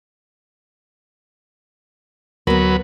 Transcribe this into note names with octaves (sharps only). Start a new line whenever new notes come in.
D2 F#3 B3 A#4 B4